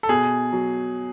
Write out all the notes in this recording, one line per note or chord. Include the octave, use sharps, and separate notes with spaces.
A4
B2 G#4
F#3